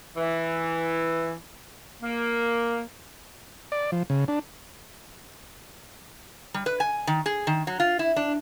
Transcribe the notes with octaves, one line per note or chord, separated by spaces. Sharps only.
E3
A#3
D5
F3
C#3
D4
G3
B4
G#5
D#3
G#4
D#3
F#3
F4
E4
D4